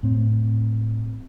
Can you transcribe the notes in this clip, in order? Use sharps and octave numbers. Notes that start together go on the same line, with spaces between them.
A2 C4